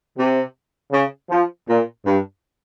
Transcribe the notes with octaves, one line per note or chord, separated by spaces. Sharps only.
C3
C#3
F3
A#2
G2